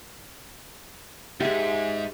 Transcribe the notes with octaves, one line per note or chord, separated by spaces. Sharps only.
G#2 G4 G#4 E5